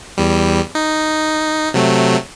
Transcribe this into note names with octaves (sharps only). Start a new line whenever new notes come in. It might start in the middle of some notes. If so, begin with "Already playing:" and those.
E2 G3
D#4
C3 F#3 A3